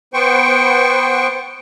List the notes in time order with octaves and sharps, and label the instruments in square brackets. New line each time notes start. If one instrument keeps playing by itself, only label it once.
[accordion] B3 C5 G5 C#6